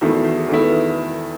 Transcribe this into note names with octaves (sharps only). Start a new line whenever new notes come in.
E2 D#3 A3 E4 F#4
F#4
F#4
G#4
E2 D#3 A3 E4 A4
B4